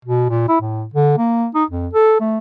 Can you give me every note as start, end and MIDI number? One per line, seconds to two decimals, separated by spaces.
0.05 0.28 47
0.29 0.46 46
0.49 0.58 64
0.61 0.85 45
0.94 1.16 50
1.18 1.47 58
1.55 1.64 63
1.70 1.87 41
1.93 2.19 69
2.20 2.38 57